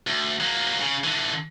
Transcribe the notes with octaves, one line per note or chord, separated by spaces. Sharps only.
D2
F#3 A#3
C#3
D3 E3